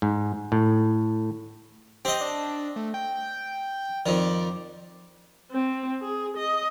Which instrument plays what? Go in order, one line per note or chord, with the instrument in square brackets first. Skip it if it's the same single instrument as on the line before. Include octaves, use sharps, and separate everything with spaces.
[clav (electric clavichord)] G#2
A2
[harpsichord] C4 D#5 [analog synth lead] G4
[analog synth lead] D4
A3
G5
[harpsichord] F2 D#3 [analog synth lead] D5
[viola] C4
G#4
D#5